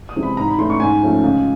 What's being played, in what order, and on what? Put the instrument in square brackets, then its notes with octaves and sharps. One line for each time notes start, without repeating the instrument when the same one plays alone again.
[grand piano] D#6
C3 E3 G#3
B5
G#2 A#5
B5
E3 A3 C#4 C6
C#6
G#2 G#5
F3 A3 C#4
C#2